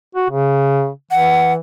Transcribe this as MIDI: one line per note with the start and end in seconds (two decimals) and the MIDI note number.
0.15 0.28 66
0.30 0.89 49
1.11 1.58 52
1.11 1.53 78